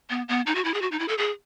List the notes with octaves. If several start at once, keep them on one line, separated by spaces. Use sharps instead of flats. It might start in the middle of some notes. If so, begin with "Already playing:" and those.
B3
B3
D#4
F#4
E4
G#4
F#4
D#4
E4
A4
G#4